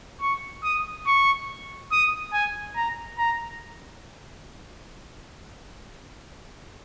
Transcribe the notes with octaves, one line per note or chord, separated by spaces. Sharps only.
C#6
D#6
C#6
D#6
G#5
A#5
A#5